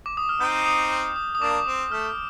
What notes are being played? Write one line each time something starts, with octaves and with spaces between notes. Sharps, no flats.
D6
D#6
F6
C4 D#4 G6
D#6
D#6
D#6
A#3 D4 D6
C4 D#6
A3 F6